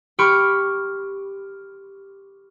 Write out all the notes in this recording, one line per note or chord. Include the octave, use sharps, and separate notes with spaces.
G4 B5 C#6 D6 F6